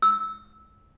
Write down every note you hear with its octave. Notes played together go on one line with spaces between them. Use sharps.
E6